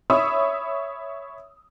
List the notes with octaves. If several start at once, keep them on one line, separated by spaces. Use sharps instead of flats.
C#5 E5 B5 C#6 D#6 E6